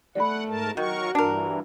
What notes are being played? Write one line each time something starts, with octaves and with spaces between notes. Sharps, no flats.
A3 D5 F#5 B5
G#2 A#4 A5
D#3 F#3 F#4 A#4 C#6
G2 E3 D4 A#4